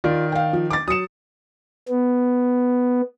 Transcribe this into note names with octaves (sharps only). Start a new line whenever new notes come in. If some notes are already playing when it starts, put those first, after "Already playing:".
D#3 F4 D5
F5 G5
F3
D6 A6
F#3 D#6 C#7 E7
B3